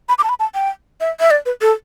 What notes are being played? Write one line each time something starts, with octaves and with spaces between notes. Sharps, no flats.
B5
D6
A5
B5
A5
G5
E5
E5
D5
B4
A4